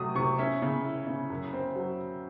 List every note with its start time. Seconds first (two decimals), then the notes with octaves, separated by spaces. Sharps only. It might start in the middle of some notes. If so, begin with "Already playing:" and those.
Already playing: C3 F#3 A3 D#6
0.15 C3 C#6
0.38 C#4 E5
0.62 C#3
0.85 E4
1.07 C#3
1.30 F#2
1.53 C4
1.76 F#3